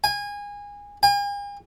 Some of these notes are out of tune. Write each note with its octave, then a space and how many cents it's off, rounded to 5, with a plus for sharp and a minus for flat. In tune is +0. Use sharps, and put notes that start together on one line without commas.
G#5 -25
G#5 -45